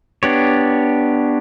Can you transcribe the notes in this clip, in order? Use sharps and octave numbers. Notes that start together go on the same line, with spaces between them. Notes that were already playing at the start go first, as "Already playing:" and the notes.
B3 D4 G4 C#5